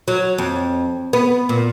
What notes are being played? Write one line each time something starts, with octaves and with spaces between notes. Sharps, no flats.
F#3
F2
B3
A#2